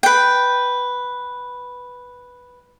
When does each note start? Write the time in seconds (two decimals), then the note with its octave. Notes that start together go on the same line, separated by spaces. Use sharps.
0.03 B4 G5